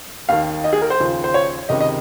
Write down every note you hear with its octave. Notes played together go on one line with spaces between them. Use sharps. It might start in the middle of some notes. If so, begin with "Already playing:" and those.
D#2 D#3 F5
D#5
G#4
A#4
C5
D#2 C#3 F3
C5
C#5
C#2 C3 D#3 D#5
D#5